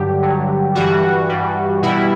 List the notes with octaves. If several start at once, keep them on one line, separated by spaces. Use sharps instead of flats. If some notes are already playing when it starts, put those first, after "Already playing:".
Already playing: G2 D3 F#3 G4
G2 D3 F#3
G2 E3 G3 F#4
G2 E3 G3
B2 G3 E4